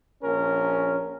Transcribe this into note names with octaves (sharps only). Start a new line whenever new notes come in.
A#1 C#4 A#4